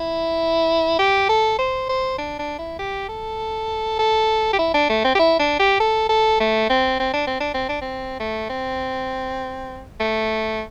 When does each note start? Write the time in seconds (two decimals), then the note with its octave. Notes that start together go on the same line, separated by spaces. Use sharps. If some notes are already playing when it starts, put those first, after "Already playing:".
Already playing: E4
0.99 G4
1.29 A4
1.58 C5
1.89 C5
2.18 D4
2.39 D4
2.58 E4
2.79 G4
3.09 A4
3.99 A4
4.53 G4
4.59 E4
4.74 D4
4.89 A3
5.04 C4
5.15 G4
5.19 E4
5.39 D4
5.59 G4
5.80 A4
6.09 A4
6.40 A3
6.70 C4
7.00 C4
7.14 D4
7.27 C4
7.41 D4
7.54 C4
7.69 D4
7.81 C4
8.20 A3
8.49 C4
10.00 A3